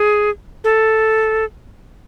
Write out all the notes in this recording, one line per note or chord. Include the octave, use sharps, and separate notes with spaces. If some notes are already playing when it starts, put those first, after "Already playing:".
Already playing: G#4
A4